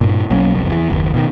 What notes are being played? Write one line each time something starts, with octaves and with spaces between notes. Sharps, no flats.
G2 A#2
B1 F#3 A#3 C#4
F#1 C2 F2
E2 E3
F#1 D#2
B2 D3 D#3